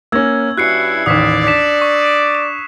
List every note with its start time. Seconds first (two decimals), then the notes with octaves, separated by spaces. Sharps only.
0.12 A#3 C#4 E6 G#6
0.58 G2 C#4 E4 F#4 F#6 C7 C#7
1.06 A1 D#2 D5 D#6 B6 E7
1.47 D4 B6 E7
1.82 C#6
2.35 E7